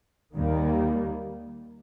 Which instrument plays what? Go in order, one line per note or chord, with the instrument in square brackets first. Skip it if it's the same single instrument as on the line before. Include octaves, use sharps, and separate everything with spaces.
[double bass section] D#2 D#3 G3 A#3